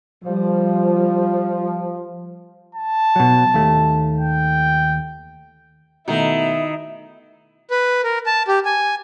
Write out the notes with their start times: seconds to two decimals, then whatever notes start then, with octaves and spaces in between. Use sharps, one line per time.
0.24 F3 G3
2.75 A5
3.16 B2 F#3
3.54 D#2 A3
4.17 G5
6.08 B2 D#3 A3 E4
7.71 B4
8.04 A#4
8.26 A5
8.48 G4
8.65 G#5